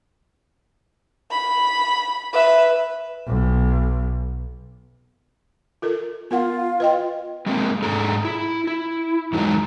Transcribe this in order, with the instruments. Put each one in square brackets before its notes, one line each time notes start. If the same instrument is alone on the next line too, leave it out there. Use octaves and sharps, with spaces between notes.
[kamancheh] B5
B4 E5
[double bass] B1
[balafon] F4 A4 A#4
[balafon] B3 A#4 F#5 [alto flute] F4
[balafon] B4 D#5 G5
[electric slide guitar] G3 G#3 A#3 C4
G#2 D4 G#4 A4 A#5
E4
E4
E2 D#3 F#3 G#3 A#5